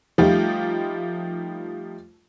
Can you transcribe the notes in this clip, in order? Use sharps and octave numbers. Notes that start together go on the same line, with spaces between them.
F3 G3 A3 D#4 F4 G4